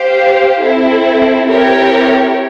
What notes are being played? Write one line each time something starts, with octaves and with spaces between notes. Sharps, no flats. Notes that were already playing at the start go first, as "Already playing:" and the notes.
Already playing: G4 C5 F5
C4 E4 A4
C4 E4 G4 A#4 C#5